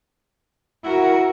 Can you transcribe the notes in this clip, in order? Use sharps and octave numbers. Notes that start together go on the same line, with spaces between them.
E4 F#4 A#4